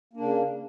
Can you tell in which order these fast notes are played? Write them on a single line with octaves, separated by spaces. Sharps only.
A#3 D4 C#3